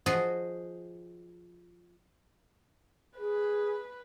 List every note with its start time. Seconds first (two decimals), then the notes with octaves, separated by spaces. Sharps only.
0.06 F3 F#4 G#4 D#5
3.18 G#4 B4